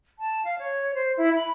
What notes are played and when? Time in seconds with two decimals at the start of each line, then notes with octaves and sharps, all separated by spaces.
0.19 A5
0.45 F5
0.59 C#5
0.94 C5
1.17 E4
1.36 B5